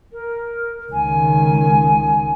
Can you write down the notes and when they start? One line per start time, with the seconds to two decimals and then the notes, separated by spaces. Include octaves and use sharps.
0.12 A#4
0.92 C#2 D#3 G#5